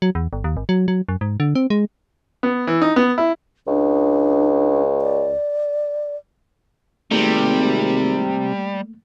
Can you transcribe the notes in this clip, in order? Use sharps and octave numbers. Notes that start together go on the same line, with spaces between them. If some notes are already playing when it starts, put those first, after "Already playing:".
F#3
E2
G1
D#2
G#1
F#3
F#3
F#2
G#2
D3
C4
G#3
B3
E3
D#4
B3
E4
C#2 D4
D5
G#1 C3 G3 A3 A#3